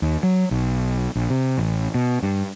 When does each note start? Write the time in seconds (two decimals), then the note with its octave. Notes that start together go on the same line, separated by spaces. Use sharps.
0.02 D#2
0.23 F#3
0.51 B1
1.15 A#1
1.30 C3
1.58 A1
1.94 B2
2.22 G2